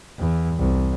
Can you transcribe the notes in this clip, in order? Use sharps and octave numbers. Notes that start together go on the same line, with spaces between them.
E2
C2